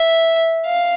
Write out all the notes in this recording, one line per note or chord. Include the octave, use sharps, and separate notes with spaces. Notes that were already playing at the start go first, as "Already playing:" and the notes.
Already playing: E5
F5